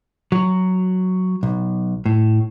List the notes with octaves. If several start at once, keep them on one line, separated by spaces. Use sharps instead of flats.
F#3
B1
A2